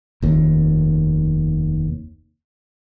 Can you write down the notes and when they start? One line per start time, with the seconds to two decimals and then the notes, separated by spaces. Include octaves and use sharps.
0.22 F1 D#2